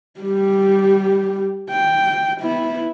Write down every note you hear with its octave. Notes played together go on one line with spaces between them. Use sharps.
G3 G4
G5
B3 E4